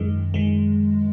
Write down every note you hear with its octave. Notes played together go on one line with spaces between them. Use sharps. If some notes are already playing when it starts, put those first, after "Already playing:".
Already playing: F#2 D#3 G#3
D#3 G#3